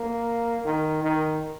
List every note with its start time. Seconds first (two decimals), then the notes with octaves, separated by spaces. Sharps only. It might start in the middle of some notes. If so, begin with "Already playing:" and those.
Already playing: A#3
0.65 D#3
1.03 D#3